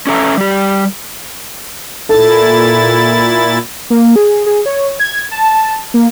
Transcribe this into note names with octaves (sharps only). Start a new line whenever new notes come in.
C#4 D4 A4 E5 A#5
G3 G4
A#2 E4 A4 A6
A#3
G#4
G#4
C#5
G#6
A5
A#3